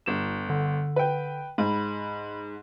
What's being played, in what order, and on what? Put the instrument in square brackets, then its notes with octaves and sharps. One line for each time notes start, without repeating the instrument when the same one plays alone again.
[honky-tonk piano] G1 E7
[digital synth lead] D3
[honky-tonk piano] B4 G5
[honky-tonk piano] G#2 [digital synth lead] B5